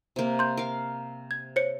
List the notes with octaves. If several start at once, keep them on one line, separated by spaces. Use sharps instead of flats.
C3 A#3
C6 G6
A#4 F5
G#6
C5 C#5 C#7